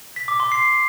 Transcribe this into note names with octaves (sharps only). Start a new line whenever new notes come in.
B6
D6
C6
C7